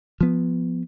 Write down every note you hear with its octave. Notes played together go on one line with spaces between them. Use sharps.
F3 B3